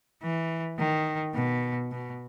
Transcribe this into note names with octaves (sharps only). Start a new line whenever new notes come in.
E3
D#3
B2
B2